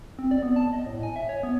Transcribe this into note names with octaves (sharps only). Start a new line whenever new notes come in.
C4
D5
B3
A5
D#5
A2
G#5
E5
C#5
B3